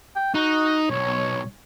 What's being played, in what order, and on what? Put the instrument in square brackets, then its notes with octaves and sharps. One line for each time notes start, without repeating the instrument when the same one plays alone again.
[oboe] G5
[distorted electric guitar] D#4 [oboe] F#4
[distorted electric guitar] B1 [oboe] C#5